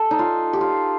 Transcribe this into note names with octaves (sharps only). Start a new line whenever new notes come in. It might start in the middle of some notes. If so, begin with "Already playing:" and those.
Already playing: A4
D#4
F4
G4
F4